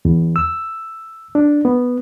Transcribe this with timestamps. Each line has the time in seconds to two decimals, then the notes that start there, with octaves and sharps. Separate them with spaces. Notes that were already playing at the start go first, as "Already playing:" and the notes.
0.05 E2
0.36 E6
1.35 D4
1.65 B3